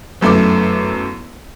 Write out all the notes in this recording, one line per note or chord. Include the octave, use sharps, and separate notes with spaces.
G1 F#2 A3 E4 D6